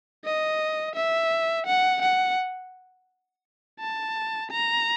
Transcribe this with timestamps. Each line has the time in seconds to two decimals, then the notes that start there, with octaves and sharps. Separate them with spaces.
0.25 D#5
0.95 E5
1.66 F#5
2.02 F#5
3.80 A5
4.51 A#5